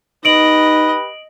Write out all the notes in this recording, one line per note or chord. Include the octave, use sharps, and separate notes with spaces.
D#4 G4 B4 D#5 D7 F#7